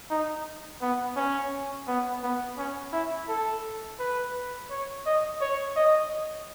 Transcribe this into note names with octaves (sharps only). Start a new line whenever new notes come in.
D#4
B3
C#4
B3
B3
C#4
E4
A4
B4
C#5
D#5
C#5
D#5